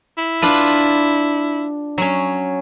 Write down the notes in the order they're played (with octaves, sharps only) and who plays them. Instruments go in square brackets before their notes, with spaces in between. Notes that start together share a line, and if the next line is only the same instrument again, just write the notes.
[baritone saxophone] E4
[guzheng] D4 F4 B4
F#3 C#4